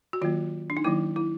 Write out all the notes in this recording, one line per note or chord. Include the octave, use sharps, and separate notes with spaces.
F#4
D#3 F#3 A#3 F4
D4
D#4
D#3 F#3 A#3 E4
E4